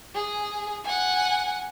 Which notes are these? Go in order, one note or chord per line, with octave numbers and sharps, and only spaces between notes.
G#4
F#5 G#5